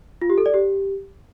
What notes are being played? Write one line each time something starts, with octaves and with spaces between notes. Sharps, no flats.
F4
G4
A4
D5
G4